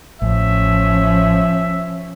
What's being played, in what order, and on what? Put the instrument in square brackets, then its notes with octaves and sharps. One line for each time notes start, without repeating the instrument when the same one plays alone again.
[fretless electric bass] A1 [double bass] F3 C#4 [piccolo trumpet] E5